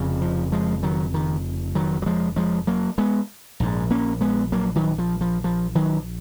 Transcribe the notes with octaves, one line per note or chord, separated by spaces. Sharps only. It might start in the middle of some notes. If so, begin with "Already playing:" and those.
Already playing: F1 F2 C#3
F3
F3 G#3
D#3 F#3
D#3
D#3 F#3
F#3
F3 G#3
F3 G#3
F#3 A#3
G#3 B3
A#1 G#2
A#3 C#4
G#3 B3
F#3 A#3
D#3 F#3
F3
F3
F3
D#3 F#3